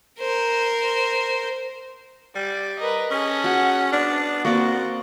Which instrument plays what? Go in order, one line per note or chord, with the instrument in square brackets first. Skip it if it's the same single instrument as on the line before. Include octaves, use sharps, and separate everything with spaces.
[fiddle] A#4 C5
[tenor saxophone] G3 [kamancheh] D5
[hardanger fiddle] A#4 B4 [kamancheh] D#5
[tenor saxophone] C#4 [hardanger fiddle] G#4 A4
[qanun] F#4 [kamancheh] F#5
[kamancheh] B3 [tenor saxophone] D4
[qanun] A#3 D5 [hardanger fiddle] C4 [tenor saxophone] F#4